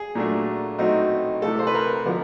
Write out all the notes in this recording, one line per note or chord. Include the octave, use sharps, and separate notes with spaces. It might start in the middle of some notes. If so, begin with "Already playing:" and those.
Already playing: G#4
A#2 F#3 A3 D4
B2 F#3 A3 C4 D#4
C3 E3 A3 A4
C5
B4
A#4
D3 F3 G#3 B3